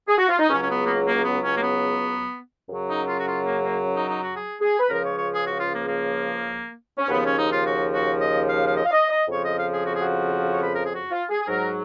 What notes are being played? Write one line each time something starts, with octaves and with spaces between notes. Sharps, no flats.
G#4
F#4
F4
D#4
C#2 C#3 F#3 C#4
C#4
B3
B3
A#3
A#3
B3
C#4
A#3
B3
F#2 C#3 F#3
D#4
F4
F#4
F4
A#3
A#3
D#4
D#4
F#4
G#4
G#4
B4
C#2 C#3 F3 A#4
C#5
C#5
G#4
F#4
F4
A#3
A#3
C#4
D#2 C#3 F3 B3
C#4
D#4
F4
F#4
F#4
D#5
F5
F5
D#5
F5
D#5
D#5
F2 C#3 F3 C#5
D#5
F5
G#4
F#4
G#4
F#4
C#5
B4
A#4
G#4
F#4
F4
G#4
G#4
G#2 F#3 A#4